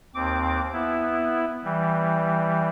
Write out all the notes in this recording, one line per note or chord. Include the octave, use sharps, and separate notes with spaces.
D#2 C4 D6
B3 E4
E3 G3